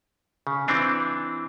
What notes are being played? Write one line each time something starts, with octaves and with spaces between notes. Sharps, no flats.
C#3
E3 C4 D4 D#4